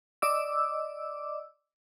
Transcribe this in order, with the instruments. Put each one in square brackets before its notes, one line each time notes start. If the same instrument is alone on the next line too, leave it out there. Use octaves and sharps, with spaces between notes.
[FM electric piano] D5 D#5 D6 E6